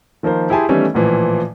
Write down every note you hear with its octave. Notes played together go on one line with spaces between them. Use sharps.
D#3 F3 A#3 A#4 C5
E4 G4 G#4 G#5 A5 C6
D#3 E3 G3 A3 B3 C#4
A1 A#2 E3 F3